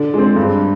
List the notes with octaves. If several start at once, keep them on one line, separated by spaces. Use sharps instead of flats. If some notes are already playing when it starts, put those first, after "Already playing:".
Already playing: D3 D5
G#3 C4
G2